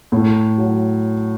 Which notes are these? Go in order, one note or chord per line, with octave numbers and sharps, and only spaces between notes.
A2
F#3